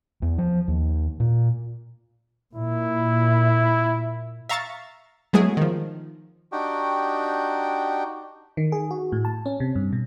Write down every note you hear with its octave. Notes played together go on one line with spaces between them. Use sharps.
E2
F3
D#2
A#2
A#2 E4
E5 F5 A#5 C#6 A6
F#3 G#3 A3 B3 E4 G#4
D#3 F3
D4 D#4 F#4 G4 G5
D#3
G#4
F#4
A2
A5
C#4
C3
G2
B2